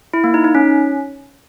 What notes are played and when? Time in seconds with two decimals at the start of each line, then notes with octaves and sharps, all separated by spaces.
0.14 E4
0.24 A#3
0.34 D#4
0.44 D#4
0.55 C#4